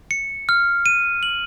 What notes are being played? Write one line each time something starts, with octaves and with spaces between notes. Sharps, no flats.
C#7
F6
D#7
F#7